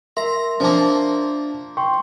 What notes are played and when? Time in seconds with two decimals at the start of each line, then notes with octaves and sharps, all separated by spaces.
0.17 A#4 E5 A#5 C6
0.60 F3 A#3 D4 A5
1.77 G5 C6 C#6